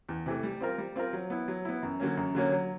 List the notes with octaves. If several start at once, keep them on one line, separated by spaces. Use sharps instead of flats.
E2
C3 E3 A3
G3
C4 F4 A#4
G3
C4 F4 A#4
F#3
B3 E4
F#3
B3 E4
F#2
D3 F#3 A#3 C#4
F#2
D3 F#3 A#3 C#4
F#3